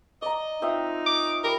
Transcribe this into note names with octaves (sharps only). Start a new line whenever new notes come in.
D5 D#5 A#5
C4 D#4 F4 E5
D6
G3 A#4 D5